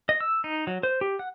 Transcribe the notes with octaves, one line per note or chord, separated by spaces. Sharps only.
D#5
E6
D#4
F#3
C5
G4
F#5